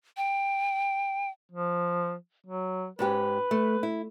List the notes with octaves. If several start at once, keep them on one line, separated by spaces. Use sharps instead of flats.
G5
F3
F#3
G#2 C#4 G4 B4
A3
E4